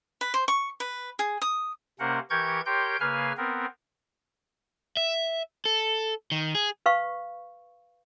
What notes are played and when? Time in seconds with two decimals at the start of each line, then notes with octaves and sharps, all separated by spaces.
0.21 B4
0.34 C5
0.48 C#6
0.80 B4
1.19 G#4
1.42 D#6
1.99 C3 A#3 C#4 A#4 C5 F#5
2.30 E3 G4 A#4 C#6 G6 G#6
2.66 G4 A#4 C#5 G5 C6 G6
3.00 C#3 A#3 B4 F5 G#5 F6
3.37 B3 C4 A#4
4.97 E5
5.65 A4
6.32 D#3
6.55 G#4
6.86 B4 F5 C#6